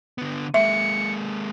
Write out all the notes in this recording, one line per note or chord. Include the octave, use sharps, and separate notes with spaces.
D3 B3
G#3 A#3 E5 C#7